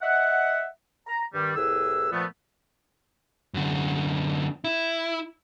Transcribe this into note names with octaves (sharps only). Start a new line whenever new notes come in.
D#5 E5 F#5
A#5
G2 D#3 G3
C2 A2 G#4 B4 E6
A#2 F3 A3 B3
F#2 D3
E4